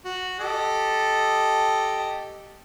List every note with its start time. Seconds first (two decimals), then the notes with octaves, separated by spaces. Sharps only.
0.05 F#4
0.40 G4 A4 D#5